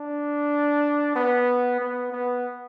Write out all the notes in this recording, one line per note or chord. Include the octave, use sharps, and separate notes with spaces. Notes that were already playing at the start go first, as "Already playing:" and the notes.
Already playing: D4
B3
B3
B3